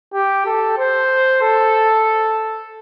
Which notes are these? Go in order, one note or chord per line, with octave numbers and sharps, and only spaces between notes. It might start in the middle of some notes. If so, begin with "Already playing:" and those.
G4
A4
C5
A4